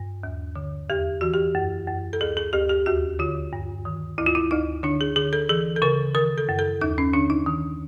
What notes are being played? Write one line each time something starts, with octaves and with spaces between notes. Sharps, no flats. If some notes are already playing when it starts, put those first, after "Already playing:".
Already playing: G2
D#2
D3
E2 G4
E3 F#4
G4
F#2
F#2
A4
D2 G#4
G#4
D2 G4
G4
D#2 F#4
D3 F4
G2
D#3
D2 E4
F4
E4
D2 D#4
D3 D4
G#4
D3 G#4
A4
E3 G#4
A4
C#3 A#4
D#3 A#4
A4
F#2
A4
D#2 D#4
C#4
D3 D4
D#4
D#3